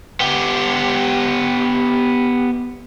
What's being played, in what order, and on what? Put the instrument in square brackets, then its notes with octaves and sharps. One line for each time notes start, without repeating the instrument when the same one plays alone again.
[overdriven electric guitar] B3 G4